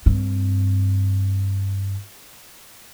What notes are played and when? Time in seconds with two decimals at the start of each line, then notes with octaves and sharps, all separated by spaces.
0.06 G2 C4